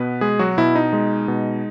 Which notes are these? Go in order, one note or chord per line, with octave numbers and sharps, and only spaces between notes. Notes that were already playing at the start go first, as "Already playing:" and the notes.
Already playing: B2 B3 B4
G#3 G#4
F#3 F#4
B2 E4
D#4
G#3
B2